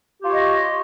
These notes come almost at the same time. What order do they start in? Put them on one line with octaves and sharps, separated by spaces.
G4 F4 C#5 D#5